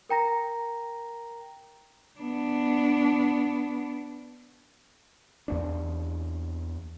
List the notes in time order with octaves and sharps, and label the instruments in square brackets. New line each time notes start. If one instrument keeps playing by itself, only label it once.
[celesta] A#4 G5 A#5 A#6
[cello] B3 D4
[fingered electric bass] E2 A#3 D4